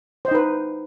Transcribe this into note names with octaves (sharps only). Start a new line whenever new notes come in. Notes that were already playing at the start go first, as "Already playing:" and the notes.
D#4 B4 C5 D#5